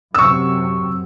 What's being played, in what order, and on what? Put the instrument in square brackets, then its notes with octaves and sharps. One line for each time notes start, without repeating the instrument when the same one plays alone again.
[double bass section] F#2 C3 [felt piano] C#6 E6